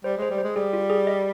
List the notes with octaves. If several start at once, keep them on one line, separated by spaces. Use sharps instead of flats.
G3 C5
G#3
C5
G3
C5
G#3
G3 G#4
F4
G#4
D#5